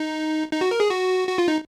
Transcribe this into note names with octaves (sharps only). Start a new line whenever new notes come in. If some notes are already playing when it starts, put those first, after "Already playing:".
Already playing: D#4
D#4
F#4
A#4
G#4
F#4
F#4
F4
D#4